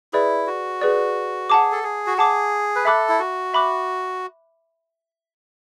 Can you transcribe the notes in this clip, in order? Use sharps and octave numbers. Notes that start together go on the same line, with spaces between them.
E4 G#4 B4 D5
F#4
G#4 B4 D5
G#4 F#5 A5 D6
A4
G#4
F#4
G#4 F#5 A5 D6
B4
A4 E5 B5 D6 F#6
E4
F#4
E5 B5 D6 F#6